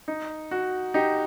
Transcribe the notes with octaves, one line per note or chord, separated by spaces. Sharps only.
D#4
F#4
D#4 G4